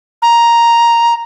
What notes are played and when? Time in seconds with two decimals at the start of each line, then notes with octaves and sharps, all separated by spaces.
0.22 A#5